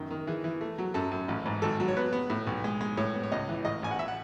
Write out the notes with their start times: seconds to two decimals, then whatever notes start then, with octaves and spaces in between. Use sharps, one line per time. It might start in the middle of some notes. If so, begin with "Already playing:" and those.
Already playing: F#2 D#3
0.11 D#3
0.27 E3 G#4
0.44 E3
0.61 A3
0.78 F#3
0.94 F#2 A4
1.12 F#2
1.28 A1
1.46 G#2
1.62 G#1 A4
1.80 F#3
1.88 C#5
1.97 B3 B4
2.13 B3
2.30 A2
2.47 B1
2.64 G#3
2.81 G#3
2.97 A2 C#5
3.14 B3
3.23 C#5
3.32 C#2 D#5
3.49 E3
3.65 A1 D#5
3.83 A1 G#5
3.91 F#5
3.99 E5
4.08 F#5